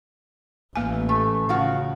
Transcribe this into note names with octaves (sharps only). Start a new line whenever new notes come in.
A1 E3 A#3 G#5
A3
C#3 F3 F4 F#4